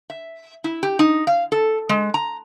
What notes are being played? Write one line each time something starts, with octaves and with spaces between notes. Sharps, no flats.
E5
E4
G4
D#4
F5
A4
G#3
A#5